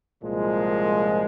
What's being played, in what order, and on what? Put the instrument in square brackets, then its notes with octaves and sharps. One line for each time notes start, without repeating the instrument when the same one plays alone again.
[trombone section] C2 A#2 F3 G#3